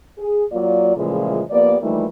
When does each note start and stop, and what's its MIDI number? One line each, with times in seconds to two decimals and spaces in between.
0.18 0.44 68
0.51 0.95 54
0.51 0.95 58
0.51 0.95 65
0.51 0.95 74
0.96 1.41 46
0.96 1.41 49
0.96 1.41 52
0.96 1.41 53
0.96 1.41 56
0.96 1.41 57
1.51 1.77 53
1.51 1.77 58
1.51 1.77 59
1.51 1.77 67
1.51 1.77 74
1.81 2.05 52
1.81 2.05 53
1.81 2.05 55
1.81 2.05 57
1.81 2.05 58
1.81 2.05 63